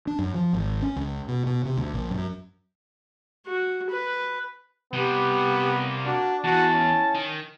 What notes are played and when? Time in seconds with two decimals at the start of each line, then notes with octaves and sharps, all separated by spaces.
0.07 D4
0.19 F#2
0.34 F3
0.53 G#1
0.82 C#4
0.96 C#2
1.28 B2
1.46 B2
1.65 C3
1.77 D2
1.94 A#1
2.10 F#2
3.46 F#4
3.90 B4
4.93 C3 G3 B3 G4 B4
5.48 A#3
6.06 D4 F#4
6.44 E2 E4 F#4 A5
6.74 C#4
7.15 D#3